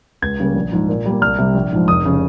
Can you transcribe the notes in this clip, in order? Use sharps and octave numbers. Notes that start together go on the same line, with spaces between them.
C#2 G#6
C#3 G3 A#3
A#1
G#2 F3
A#2
G3 A#3
C2 F6
C3 G3
A#1
G#2 F3
F1 D#6
C#3 F3